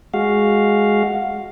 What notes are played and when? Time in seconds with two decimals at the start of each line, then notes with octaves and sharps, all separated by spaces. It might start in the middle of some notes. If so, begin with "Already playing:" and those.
0.14 G#3 F#4 F5